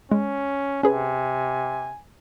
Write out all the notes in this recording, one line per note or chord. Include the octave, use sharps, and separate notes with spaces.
G#3 C#4
C3 C#4 G#4 B4 G#5